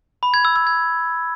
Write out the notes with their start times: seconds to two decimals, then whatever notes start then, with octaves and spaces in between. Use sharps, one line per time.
0.23 B5
0.34 G#6
0.45 E6
0.56 E6
0.67 G#6